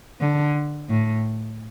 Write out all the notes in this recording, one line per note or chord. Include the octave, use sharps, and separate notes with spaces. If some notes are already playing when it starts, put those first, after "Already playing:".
D3
A2